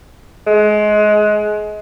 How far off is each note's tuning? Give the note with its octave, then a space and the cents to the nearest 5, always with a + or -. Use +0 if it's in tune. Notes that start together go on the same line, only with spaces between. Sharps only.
G#3 +25